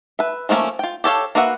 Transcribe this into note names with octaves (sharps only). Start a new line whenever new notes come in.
B4 E5
F3 A3 A#3 C4 C#4
F4 G5
G4 A4 C#5 F5
A#3 F#4 B4 E5 F#5